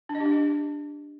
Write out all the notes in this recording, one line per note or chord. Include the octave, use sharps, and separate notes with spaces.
D4
D#5
G4
D4
G4